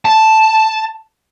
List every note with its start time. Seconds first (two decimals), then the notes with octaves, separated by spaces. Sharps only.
0.05 A5